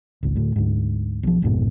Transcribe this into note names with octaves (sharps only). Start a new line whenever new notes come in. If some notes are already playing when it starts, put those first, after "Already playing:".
G#1 C#2
D2 A2
D2 G#2
B1 F3
A1 F2 G#2 B2